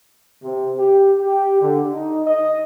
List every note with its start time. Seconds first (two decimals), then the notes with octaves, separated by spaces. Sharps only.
0.43 C3
0.78 G4
1.20 G4
1.61 D3
1.93 D#4
2.26 D#5